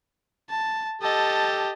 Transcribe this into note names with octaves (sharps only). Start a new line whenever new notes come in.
A5
G4 A4 D#5 A5